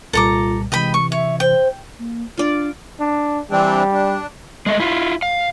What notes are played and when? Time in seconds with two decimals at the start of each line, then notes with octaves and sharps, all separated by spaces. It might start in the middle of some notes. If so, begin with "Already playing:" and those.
0.13 C2 A#2 G3 F4 A4 A#5 D6
0.72 C3 E3 G#3 D#5 G5 B5
0.94 C#6
1.12 C#5 E5
1.40 C5 G5
1.99 A#3
2.38 D4 F4 D5
3.00 D4
3.51 E3 G3 C4 D4
3.92 D4
4.66 G#3 A3 D#5
4.80 E4 F4
5.22 F5